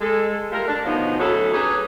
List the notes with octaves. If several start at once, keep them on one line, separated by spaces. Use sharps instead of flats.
G#3 A4
G3 A3 F4 A#4
D4
D2 B2 F3 F#3 D#4
D2 F#3 C#4 E4 G#4 A4
C#4 D#4 G4 G#4 B4